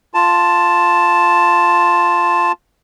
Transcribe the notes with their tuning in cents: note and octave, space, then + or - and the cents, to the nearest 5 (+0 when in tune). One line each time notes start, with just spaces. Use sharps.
F4 +0 A5 +0